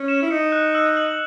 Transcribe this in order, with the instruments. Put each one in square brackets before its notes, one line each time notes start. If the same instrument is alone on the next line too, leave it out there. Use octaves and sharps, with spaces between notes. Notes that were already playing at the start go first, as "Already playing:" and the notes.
Already playing: [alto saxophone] C#4
[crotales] E7
[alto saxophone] E4
[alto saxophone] D#4 [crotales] C#7
[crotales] F#6
E6
F#7